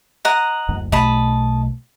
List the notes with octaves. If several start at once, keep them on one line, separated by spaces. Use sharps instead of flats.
D#5 F#5 A#5
F#1 D2
B1 B2 A3 D#5 A5 B5